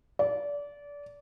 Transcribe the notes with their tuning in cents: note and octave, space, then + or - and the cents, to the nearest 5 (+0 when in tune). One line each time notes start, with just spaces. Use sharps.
D5 -25